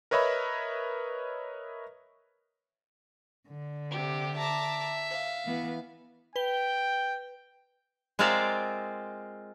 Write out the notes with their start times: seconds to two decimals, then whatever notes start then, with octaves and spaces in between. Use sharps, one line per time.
0.11 A#4 B4 C#5 D#5 E5 B5
3.48 D3
3.89 C3 G4
4.36 E5 A5 A#5 D6
5.11 F5
5.45 E3 B3
6.36 B4 G5 G7
8.19 G#3 C4 F4 A#4 D5 E5